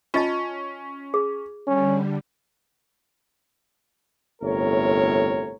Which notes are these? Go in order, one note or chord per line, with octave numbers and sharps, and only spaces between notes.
C#4 F4 D#5 A5
G#4
D3 G3 C#4
G1 A2 C3 A#4 C#5